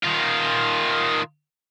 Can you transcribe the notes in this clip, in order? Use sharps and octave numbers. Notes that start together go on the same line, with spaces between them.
D#3 F4